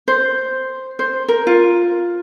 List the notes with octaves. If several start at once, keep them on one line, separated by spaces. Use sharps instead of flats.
C5
C5
A#4
F4